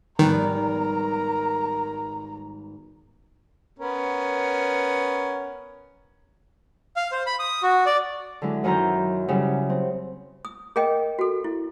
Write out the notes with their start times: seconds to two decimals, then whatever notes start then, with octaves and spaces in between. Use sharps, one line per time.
0.19 G#1 D#3 G3 B3 A#4 A#5
3.79 B3 C#4 A#4
6.96 F5
7.12 C5
7.26 B5
7.39 D#6
7.63 F#4
7.86 D5
8.42 D3 F#3 G#3 E4
8.64 F#2 D#3 F#3 E4 A#5 G6
9.28 C#3 F#3 G3 E4
9.70 C4
10.45 D#6
10.76 G#4 A#4 D#5 G5
11.19 F#4 A4
11.44 E4